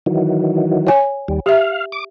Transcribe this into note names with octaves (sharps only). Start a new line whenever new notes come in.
D#3 E3 F#3
C#5 G#5
D#2 G3
G4 E5 F5
D6